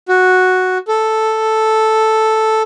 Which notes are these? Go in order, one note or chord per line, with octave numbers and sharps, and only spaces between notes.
F#4
A4